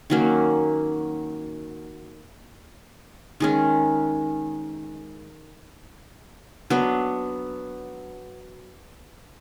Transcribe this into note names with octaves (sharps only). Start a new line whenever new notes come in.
D#3 F#3 A#3 C#4
D#3 G#3 C#4
F#3 B3 D4